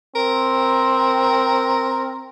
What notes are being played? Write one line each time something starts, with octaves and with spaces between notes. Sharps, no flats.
C4 A#4